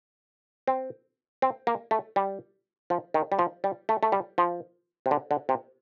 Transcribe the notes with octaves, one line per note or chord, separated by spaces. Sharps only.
C4
C4
A#3
A3
G3
F3
D#3
G3
F3
G3
A3
A3
G3
F3
C3
D3
D3
C3